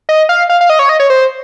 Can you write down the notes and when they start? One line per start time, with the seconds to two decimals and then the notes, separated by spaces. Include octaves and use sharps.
0.09 D#5
0.29 F5
0.50 F5
0.61 F5
0.70 D#5
0.79 C#5
0.89 D#5
1.00 C#5
1.10 C5